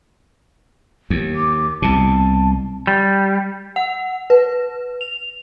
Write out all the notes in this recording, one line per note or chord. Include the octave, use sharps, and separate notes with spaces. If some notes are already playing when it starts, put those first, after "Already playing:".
D#2
D6
C2 B2 A5
G3
F#5
B4
F7